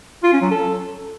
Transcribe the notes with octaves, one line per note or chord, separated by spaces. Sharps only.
F4
C#4
F#3
A4